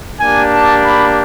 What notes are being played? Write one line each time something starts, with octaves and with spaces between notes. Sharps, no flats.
A#3 D4 G4 G#5
A5
B5